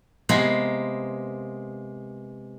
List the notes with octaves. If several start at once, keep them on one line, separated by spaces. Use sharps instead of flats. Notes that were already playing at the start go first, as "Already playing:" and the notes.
C3 G#3 A#3 B3 G#5